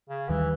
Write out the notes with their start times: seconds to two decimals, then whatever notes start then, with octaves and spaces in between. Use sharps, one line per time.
0.09 C#3
0.29 D#2 D#3 E3 G3